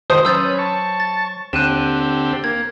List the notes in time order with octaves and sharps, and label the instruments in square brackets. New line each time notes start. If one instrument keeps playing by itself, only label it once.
[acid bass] D#3 [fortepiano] C5 [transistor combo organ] D#5 [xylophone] D#6
[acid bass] F#3 [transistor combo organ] C#4 B4 [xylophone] E6 G6 A6
[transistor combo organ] A5 C#6
[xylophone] A6
[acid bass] D#2 [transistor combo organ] D3 C4 G4 [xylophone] F#6 D#7 E7
[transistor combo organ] A#3 [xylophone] G#6